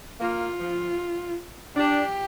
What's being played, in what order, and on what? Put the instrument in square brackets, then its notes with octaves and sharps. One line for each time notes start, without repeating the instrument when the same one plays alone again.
[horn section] A#3 [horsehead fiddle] F4
[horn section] F3
[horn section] D4 [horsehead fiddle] G4